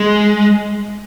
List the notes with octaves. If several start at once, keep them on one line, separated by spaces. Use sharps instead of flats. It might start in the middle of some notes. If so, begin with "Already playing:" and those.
Already playing: G#3